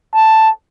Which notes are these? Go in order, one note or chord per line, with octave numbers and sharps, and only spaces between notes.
A5